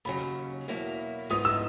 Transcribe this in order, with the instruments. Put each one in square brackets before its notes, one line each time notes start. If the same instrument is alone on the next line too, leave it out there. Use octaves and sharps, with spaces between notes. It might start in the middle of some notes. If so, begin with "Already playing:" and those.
[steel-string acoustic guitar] D#2 C#3 F#3 [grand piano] B5
[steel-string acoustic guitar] E2 B2 F#3 A#3 E4
[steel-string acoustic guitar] G#2 E3 B3 D#4 [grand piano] D#6
[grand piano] E6